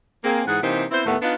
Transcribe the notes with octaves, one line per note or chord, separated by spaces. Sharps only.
A#3 C4 G#4
G#2 E3 G#4 F#5
C3 E3 A#3 D#4 G4 C5
B3 C4 E4 C5
D#2 A2 A3 B3
B3 D4 D#4 F4